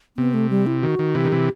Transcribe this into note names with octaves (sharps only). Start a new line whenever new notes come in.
C3 B3
A3
G3
E4
D#3 F#4
D#3
C3 E3 G4
D#3
C3 E3